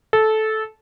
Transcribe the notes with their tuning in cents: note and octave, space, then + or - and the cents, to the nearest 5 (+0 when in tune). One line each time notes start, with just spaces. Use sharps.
A4 -15